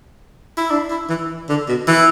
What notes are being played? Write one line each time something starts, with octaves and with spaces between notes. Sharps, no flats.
E4
D4
E4
E3
D3
B2
E3